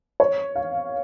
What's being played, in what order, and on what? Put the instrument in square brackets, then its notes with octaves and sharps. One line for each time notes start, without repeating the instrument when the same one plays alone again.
[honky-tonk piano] C#5
F5